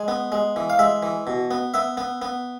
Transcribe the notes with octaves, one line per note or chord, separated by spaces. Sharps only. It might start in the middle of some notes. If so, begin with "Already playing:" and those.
Already playing: G#3 G#5
B3
G#3
E3
F5
G#3 E5
E3
B2
B3
B3 E5
B3
B3